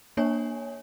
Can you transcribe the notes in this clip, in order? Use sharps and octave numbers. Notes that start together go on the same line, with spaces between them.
A#3 D4 C#5 G#5